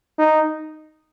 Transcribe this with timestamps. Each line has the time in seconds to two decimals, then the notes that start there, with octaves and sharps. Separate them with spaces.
0.19 D#4